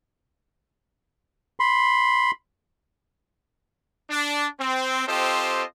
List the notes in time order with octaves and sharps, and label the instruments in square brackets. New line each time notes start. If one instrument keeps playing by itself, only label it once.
[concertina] B5 C6
[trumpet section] D4
C4
C4 F4 G4 A4 C5 D#5